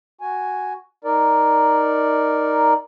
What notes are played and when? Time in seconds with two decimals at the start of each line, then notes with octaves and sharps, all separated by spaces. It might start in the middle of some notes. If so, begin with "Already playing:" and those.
0.21 F#4 G#5
1.04 D#4 A#4 D5